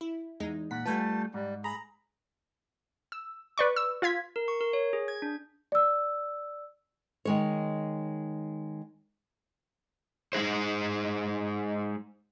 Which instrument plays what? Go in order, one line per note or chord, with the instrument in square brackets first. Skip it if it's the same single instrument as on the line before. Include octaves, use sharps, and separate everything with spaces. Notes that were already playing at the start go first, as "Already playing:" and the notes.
[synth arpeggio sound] E4
E2 G#3 D#4
[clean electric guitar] A#2 [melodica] F#5 [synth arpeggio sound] B6
[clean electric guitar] G3 A3 F4 [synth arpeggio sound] B4 F#5 G#5 [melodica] A5
[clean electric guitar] G#2 [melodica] G3
[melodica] G#4 B5 [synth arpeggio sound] A#5
[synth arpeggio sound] E6
B4 D5 C#6
E6
F4 F5 G#6 B6
[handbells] A#4
C#6
A#4
C#5
G#4
G#6
D4
[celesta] D5 E6
[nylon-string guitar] D#3 G#3 C#5
[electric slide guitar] G#3 D#4 G#4 C5